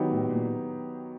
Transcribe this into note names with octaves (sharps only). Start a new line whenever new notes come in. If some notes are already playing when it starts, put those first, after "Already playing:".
Already playing: D#3 F#3 B3 D#4 G4
A2
A#2